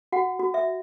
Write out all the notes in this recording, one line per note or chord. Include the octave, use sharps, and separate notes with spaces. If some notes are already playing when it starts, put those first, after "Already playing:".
F#4 F#5
F#4
E5